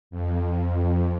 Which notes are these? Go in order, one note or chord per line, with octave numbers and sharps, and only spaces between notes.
F2